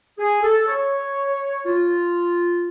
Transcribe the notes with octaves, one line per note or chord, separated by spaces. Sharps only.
G#4
A4
C#5
F4